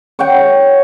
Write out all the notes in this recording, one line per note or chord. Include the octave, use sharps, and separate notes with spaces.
C#5 F#5 G5